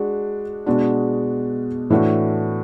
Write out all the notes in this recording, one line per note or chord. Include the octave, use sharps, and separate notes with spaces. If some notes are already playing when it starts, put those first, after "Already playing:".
Already playing: G#3 D4 F#4
B2 G#3 D4 F#4
A2 E3 A3 D4 F#4